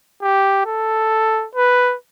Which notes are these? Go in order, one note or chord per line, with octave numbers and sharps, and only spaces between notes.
G4
A4
B4